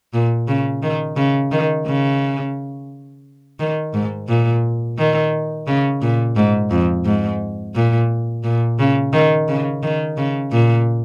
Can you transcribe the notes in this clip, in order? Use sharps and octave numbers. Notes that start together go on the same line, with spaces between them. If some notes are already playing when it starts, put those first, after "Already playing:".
A#2
C#3
D#3
C#3
D#3
C#3
D#3
G#2
A#2
D#3
C#3
A#2
G#2
F2
G#2
A#2
A#2
C#3
D#3
C#3
D#3
C#3
A#2